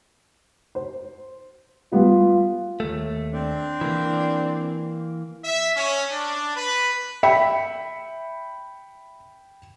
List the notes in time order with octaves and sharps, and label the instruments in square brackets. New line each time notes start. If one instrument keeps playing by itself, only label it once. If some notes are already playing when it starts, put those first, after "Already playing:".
[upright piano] C5
[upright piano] G3 B3 [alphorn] F4
[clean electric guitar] D#2 A3
[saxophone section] C4 D4
[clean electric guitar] E3 A#3
[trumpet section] E5
C#4
D4
B4
[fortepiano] E5 [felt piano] G5 B5 C#7